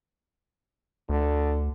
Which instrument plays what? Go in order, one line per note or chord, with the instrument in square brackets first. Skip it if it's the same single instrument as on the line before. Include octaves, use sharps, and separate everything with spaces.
[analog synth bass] D2 [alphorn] D3